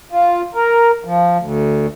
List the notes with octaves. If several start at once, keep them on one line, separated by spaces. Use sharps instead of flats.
F4
A#4
F3
D2